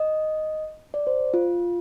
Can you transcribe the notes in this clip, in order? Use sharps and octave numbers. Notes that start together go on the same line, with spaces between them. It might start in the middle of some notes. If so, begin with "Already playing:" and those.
Already playing: D#5
D5
C5
F4